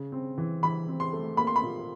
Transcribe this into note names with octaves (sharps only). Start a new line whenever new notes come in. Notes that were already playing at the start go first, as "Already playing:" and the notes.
Already playing: C#3
C4
E3
E3 B5
C4
C6
A3
A#3 B5
C6
B5
A#2